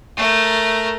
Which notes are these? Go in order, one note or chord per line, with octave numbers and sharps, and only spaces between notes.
A3 A#4